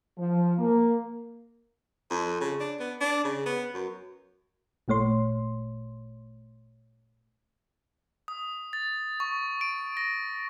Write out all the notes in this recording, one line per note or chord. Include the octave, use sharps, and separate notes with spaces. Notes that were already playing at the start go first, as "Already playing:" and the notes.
F3
A#3
F2
C#3
D4
B3
D4
C#3
B3
F#2
G#1 A#2 A3 C#5 C6
D#6
A6
C#6
D7
A#6